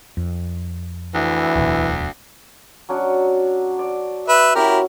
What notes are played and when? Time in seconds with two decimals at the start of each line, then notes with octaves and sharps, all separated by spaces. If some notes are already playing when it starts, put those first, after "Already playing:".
0.17 F2
1.15 D2 E3
1.55 D1 E2 B2
2.89 F#3 C#4 D4
3.79 D5
4.29 B4 E5
4.55 C#4 E4 F#4 G4 A#4 E6